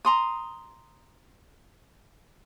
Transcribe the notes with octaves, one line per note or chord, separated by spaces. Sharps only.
A#5 C6 D#6